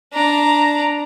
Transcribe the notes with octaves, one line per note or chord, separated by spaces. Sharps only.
D4 A#5